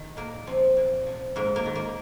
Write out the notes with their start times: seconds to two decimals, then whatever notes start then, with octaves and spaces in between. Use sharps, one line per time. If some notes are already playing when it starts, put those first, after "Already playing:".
Already playing: D#3
0.17 A#2 A#3
0.47 F3 C4
0.77 A#2
1.06 F3
1.36 G#2 A#3
1.56 A#3
1.66 D#3
1.75 A#3